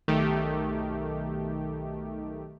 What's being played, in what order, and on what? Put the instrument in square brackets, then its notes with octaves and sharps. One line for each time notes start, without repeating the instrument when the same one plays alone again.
[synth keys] B1 D#3 A3 G4